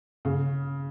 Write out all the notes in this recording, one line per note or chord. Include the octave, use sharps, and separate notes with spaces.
C#3